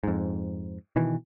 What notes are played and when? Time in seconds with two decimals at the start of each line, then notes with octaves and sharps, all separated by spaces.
0.04 F2 G#2
0.96 B2 D#3 E3